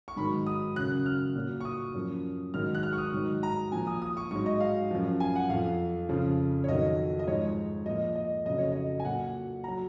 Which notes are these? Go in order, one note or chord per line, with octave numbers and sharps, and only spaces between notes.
C#6
G#2 D#3 F#3 B5
D#6
F#2 C#3 F#3 F#6
F6
A#2 F#3
C#6
D#6
F#2 F3
G#2 D#3 F#3 F6
F#6
F6
C#6
D#6
G#2 D#3 F#3
A#5
A#2 F3 G#5
D#6
D#6
C#6
G#2 F#3 C#6
D#5
F5
F#2 F3
G#5
F#5
F2 F3 F5
F2 C#3 F3
C#5
F2 D#3 F#3 D#5
D#5
G#2 F3 C#5
A#2 F3 D#5
D#5
F2 C#3 F#3 D#5
C#5
D#5
G#5
A#2 F#3 F#5
F#3 A#5